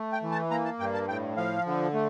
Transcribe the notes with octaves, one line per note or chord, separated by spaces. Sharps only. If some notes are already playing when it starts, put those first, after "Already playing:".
Already playing: A3
G5
E3
A5
A#3 A#5
A5
G2 G5
A5
A2 G5
F3 F5
D3
A3